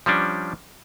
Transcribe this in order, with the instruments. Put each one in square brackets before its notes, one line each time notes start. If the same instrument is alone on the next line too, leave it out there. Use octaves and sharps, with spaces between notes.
[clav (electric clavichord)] F3 G3 C#4 D4